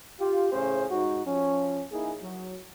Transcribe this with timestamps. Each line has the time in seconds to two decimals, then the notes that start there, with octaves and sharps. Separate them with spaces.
0.20 F4 G4
0.52 A2 C#3 C#4 G#4 C5
0.90 G#2 D#4 F#4
1.26 F3 C#4
1.92 A#3 D#4 E4 G#4
2.22 F#3